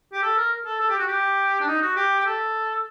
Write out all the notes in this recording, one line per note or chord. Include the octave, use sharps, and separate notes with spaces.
G4
A4
A#4
A4
A4
G4
F#4
G4
D4
D#4
F#4
G4
G4
A4